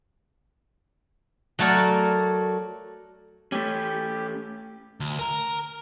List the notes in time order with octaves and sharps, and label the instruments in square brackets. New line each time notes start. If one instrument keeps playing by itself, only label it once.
[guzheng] F#3 A3 F#4 A#4 D5
[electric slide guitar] A3 C#4 [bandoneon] G4
[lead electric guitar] D2
A#4 A#5